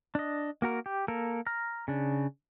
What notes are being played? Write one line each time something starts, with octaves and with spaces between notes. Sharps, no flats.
D4 D#5
A#3 F#4 A#4
G4
A#3 A4 A#4
A#5 F6
C#3 D4